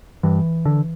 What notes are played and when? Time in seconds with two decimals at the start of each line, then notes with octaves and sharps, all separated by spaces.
0.23 G2 E3
0.66 D3